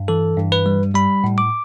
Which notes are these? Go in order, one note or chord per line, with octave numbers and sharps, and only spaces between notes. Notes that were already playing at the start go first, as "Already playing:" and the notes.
Already playing: G2
E3 A4
G2
B4
G3
G3 B5
A2
D6